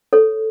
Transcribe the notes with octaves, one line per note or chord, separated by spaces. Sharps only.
A4 C#5